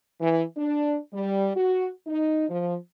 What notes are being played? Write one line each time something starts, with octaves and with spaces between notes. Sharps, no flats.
E3
D4
G3
F#4
D#4
F3